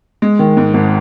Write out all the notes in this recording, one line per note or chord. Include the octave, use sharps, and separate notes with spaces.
G#3
D#3
G#2
G#1